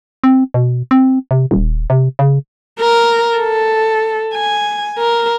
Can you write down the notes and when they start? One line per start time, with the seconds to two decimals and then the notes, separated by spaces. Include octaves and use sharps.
0.24 C4
0.54 B2
0.91 C4
1.31 C3
1.51 D#1
1.90 C3
2.19 C#3
2.80 A#4
3.38 A4
4.34 G#5
4.98 A#4